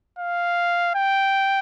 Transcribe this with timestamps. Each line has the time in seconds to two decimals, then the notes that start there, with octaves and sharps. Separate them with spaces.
0.19 F5
0.95 G5